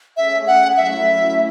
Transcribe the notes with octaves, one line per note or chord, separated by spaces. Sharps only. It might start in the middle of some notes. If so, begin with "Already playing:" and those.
A3 C#4 G#4 E5
F#5
F#3 A3 C#4 E4 E5